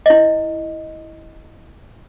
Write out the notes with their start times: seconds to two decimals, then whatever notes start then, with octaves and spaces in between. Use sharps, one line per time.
0.06 E4 D#5